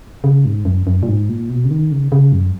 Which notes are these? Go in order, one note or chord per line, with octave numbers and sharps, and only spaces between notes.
C#3
G#2
F#2
F#2
A#2
G#2
A#2
B2
C#3
D#3
C#3
C#3
F#2